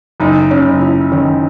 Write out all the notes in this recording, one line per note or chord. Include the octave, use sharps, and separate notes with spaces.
F#1 D#4
C#4
F#1
E4
D#3 C#4